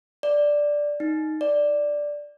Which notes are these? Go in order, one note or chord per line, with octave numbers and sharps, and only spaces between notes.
D5
D#4
D5